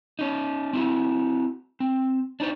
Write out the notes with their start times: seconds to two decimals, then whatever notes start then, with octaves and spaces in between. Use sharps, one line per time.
0.19 C#4 D#4
0.73 C4 E4 F#4
1.80 C4
2.40 D4 D#4 C5